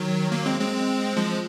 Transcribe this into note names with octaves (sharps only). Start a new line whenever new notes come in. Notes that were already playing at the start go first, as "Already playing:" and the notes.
Already playing: D#3 F#3
F#3 A#3
G#3 C4
G#3 C4
F3 G#3